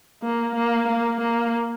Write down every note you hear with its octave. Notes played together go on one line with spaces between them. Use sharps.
A#3
A#3
A#3
A#3